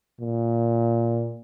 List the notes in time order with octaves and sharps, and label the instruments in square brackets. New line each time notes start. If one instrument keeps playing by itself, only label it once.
[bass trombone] A#2